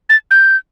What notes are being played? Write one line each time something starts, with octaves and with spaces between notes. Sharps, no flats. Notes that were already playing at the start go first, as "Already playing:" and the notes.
A6
G6